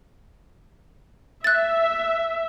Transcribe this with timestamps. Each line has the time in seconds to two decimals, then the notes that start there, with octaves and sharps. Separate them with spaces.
1.44 E5 F#6 A6